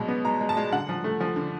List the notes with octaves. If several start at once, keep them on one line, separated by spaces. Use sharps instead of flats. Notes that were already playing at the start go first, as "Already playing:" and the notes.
Already playing: B2 F#3 G#3
B3
G#3 A#5
G#3
A5
G#3
D3 F#5
F3
A3
F3
D3